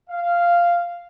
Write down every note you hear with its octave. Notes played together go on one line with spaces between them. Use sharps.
F5